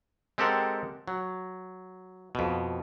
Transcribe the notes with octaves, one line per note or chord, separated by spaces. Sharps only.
G#3 C4 G4 A4 A#4 F#5
F#3
F2 B2